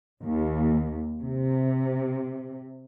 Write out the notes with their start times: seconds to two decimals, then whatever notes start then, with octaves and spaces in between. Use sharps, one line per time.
0.23 D#2
1.22 C3